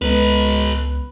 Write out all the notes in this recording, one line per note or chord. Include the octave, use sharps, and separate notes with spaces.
C#2 G#3 B3 A4 B4